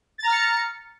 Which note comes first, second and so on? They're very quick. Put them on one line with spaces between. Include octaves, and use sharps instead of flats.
A6 A#5 F6 C#7